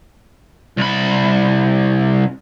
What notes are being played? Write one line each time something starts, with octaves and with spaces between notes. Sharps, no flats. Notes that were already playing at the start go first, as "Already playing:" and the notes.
C2 B5